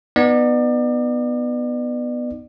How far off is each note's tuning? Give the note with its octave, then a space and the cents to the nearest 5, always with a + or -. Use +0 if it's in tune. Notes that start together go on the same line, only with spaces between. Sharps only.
B3 +0 D#4 -10 D5 +35